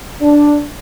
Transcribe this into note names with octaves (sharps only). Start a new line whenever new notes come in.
D4